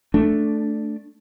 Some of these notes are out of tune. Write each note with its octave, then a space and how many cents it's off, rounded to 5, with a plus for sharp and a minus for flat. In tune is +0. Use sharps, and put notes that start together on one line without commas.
A3 +0 D4 -5